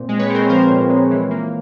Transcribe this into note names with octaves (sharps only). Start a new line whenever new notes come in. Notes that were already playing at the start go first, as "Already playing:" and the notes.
Already playing: A#2 C4
G#3
B4 C#5
C4 A#4 C5
F3 A#4 C5
A#2
G#3
E3
A#3